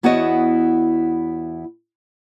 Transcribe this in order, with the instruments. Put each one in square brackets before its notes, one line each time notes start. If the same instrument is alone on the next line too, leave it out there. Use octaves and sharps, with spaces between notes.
[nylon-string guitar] E2 B3 E4 F#4 C#5 D#5